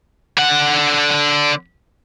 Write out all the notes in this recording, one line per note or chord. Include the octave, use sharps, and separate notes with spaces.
D3 F#5